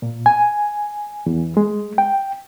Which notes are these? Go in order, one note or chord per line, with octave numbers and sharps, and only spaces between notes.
A#2
G#5
E2
G#3
G5